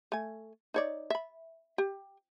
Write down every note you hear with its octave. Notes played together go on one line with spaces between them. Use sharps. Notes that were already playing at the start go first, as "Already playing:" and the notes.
A3 G#5
D#4 C#5 D5
E5 B5
G4